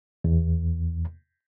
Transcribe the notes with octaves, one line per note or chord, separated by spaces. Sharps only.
E2